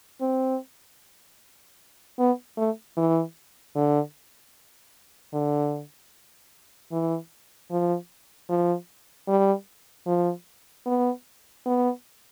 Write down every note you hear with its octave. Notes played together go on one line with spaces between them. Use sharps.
C4
B3
A3
E3
D3
D3
E3
F3
F3
G3
F3
B3
B3